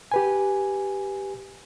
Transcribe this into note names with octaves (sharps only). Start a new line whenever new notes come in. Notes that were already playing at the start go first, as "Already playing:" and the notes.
G4 B4 G#5